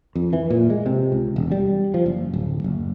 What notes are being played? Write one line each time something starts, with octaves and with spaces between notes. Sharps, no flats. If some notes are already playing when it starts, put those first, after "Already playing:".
F2
E3
A#2
G#3
C3
C#2
E1
G3
F3
F#1
D1
F#1